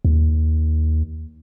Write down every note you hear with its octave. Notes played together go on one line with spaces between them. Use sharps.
D#2